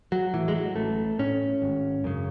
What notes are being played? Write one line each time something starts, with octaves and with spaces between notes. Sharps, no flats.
F#3
A2 E3
G#3
F#3
A1 A3
A2 C#4
G#1
F#2 C#3